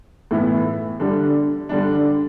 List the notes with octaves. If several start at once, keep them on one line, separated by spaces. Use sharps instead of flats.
A2 E3 B3 E4
D3 G3 D4
D3 G3 D4